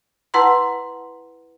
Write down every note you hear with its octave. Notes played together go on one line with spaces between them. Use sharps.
E4 B4 F#5 A5 A#5 C6